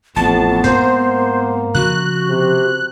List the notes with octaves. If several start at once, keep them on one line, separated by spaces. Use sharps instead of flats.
A1 F2 B3 A5
G#2 A#3 C4 C5
C#3 F3 F#4 F#6
C3